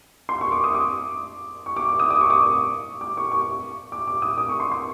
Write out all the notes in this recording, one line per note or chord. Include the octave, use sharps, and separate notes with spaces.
C6
C#6
D6
D#6
D6
C#6
D6
D6
D#6
D6
C#6
D6
D6
C#6
C#6
D6
D6
D#6
D6
C#6
C6
C6